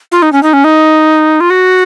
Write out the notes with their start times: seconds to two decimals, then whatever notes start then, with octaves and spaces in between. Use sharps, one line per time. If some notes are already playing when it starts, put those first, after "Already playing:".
0.12 F4
0.22 D#4
0.32 C#4
0.43 D#4
0.53 C#4
0.64 D#4
1.40 F4
1.50 F#4